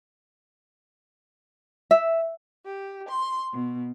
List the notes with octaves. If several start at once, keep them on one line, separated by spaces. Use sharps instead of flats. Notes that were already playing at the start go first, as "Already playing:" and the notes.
E5
G4
C6
B2